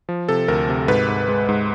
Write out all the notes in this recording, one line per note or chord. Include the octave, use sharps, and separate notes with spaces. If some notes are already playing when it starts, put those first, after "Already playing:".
F3
C3 A4
D2 A#4
C3
G#2 B4
G#2
G#3
G#2